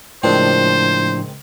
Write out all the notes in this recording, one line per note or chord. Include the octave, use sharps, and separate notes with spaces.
C#2 A2 D#3 F3 C4 D4 C5